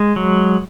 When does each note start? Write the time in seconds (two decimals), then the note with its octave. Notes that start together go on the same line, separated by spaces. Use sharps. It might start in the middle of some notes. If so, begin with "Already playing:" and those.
Already playing: G#3
0.16 F#3